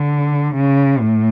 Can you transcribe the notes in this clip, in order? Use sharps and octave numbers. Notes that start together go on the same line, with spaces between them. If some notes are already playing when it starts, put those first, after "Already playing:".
Already playing: D3
C#3
A2